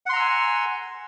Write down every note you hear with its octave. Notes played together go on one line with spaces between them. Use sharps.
F#5 G#5 A#5 C6 E6